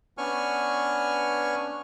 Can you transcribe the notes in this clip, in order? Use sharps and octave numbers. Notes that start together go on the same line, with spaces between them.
B3 C#4 D4 G#5 C#6 F6